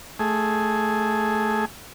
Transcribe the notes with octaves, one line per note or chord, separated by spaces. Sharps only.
A3 G#4